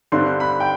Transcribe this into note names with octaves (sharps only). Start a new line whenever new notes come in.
G2 D3 G3 C4 C6
B5
G5